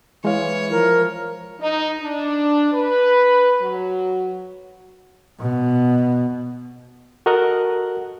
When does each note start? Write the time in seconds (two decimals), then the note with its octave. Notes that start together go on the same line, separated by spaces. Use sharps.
0.25 E3 G#3 C#5 F5
0.72 F3 A#4
1.60 D#4
2.01 D4
2.73 B4
3.62 F#3
5.40 B2
7.26 F#4 A4 A#4 D#5 F#5 F#6